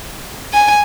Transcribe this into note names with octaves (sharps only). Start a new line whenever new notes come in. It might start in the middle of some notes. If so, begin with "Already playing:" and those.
G#5